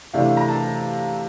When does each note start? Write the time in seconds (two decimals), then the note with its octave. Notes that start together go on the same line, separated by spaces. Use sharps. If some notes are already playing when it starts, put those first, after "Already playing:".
0.14 C3 E3 A3 D4 F5
0.25 F5
0.37 A#5
0.48 A5